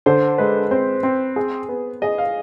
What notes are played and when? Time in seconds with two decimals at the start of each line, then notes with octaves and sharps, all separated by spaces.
0.06 D3 C5
0.38 G#3 B4
0.71 C4 C5
1.03 C4
1.36 G#4
1.69 B3
2.02 G#4 D#5
2.18 F5